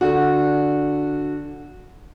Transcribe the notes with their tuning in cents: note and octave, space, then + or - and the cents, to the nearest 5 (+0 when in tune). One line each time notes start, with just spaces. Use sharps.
D3 +0 D4 -5 F#4 -15